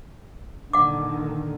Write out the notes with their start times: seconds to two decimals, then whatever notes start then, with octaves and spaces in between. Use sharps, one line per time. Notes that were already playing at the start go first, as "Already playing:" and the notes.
0.73 A#2 D3 D#3 F#5 D6